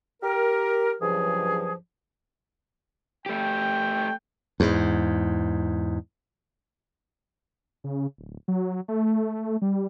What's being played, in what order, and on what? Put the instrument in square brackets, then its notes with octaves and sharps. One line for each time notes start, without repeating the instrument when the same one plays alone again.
[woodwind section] G4 A#4
C#2 G2 F3 F#3 G#4
[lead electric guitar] A3 G4 [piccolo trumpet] G5
[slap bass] E2 G#2
[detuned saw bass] C#3
D1
F#3
A3
G3